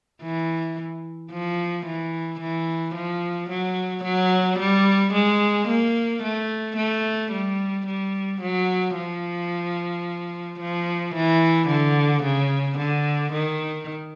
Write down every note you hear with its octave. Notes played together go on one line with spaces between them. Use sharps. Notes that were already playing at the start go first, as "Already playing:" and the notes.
E3
F3
E3
E3
F3
F#3
F#3
G3
G#3
A#3
A3
A3
G3
G3
F#3
F3
F3
E3
D3
C#3
D3
D#3